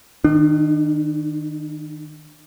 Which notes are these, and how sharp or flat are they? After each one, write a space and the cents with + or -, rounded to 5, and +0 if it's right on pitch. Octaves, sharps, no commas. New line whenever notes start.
D#3 +0 D4 +40